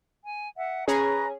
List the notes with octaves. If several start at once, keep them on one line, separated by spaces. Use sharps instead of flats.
G#5
E5 F#5
C#4 G#4 B4 A#5 C#6